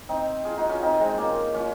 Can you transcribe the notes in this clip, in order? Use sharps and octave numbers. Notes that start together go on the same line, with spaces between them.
C4 D#4
F4 G#4
D#4 F#4
C#4 F4
C4 D#4
G#3 C4
A#3 C#4
C#4 F4